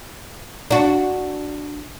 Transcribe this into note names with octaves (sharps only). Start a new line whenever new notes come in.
D4 F#4